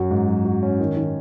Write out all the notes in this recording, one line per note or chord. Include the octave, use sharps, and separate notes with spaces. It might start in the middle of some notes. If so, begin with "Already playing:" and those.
Already playing: F#2 F#3 F#4
G#2
F#3
F#4
C#4
D#3
D#3